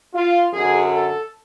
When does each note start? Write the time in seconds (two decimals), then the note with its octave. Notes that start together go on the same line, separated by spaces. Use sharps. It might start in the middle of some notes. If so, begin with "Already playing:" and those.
0.14 F4
0.53 F#2 D3 F#3 G#4
0.93 A4